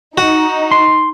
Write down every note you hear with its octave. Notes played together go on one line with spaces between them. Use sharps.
D#4 F#4
C6